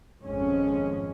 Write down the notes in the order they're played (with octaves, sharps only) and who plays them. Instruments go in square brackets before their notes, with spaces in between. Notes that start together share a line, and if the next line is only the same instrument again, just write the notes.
[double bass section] G#1 F2 F3 G#3 C#4